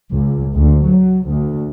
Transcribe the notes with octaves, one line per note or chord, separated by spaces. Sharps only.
C#2
D2
F#3
D2